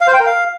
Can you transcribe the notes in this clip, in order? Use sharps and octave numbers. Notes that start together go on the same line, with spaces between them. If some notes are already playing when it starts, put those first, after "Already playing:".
F5
C5
G5
A#4
F5